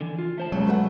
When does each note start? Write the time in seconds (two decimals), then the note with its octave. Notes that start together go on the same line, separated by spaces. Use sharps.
0.01 D3 E3
0.19 F4
0.38 A3 C5 A5
0.52 F1 C#3 F#3 G#3
0.67 A3 B4 F#5